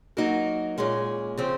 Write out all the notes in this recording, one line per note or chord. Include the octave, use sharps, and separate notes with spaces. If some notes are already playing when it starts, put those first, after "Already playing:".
F#3 A#3 D#4 F#4 A#4
A#2 G#3 C#4
C#3 F3 C4